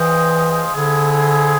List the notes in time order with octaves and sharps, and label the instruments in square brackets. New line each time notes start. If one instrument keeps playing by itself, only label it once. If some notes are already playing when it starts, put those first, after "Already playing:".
Already playing: [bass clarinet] E3 [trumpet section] F4 G#4 C5 D#5 G5
[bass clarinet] D3 [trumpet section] C4 E4 G#4